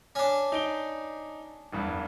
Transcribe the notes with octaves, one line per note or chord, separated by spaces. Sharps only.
C#4 D4
D#4 D7 G7
F#1 E2 G2